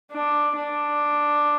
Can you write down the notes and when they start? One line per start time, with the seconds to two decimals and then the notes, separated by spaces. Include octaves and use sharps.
0.12 D4
0.56 D4